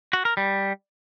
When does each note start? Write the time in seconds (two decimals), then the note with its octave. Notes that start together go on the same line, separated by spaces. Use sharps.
0.13 F#4
0.25 A#4
0.37 G3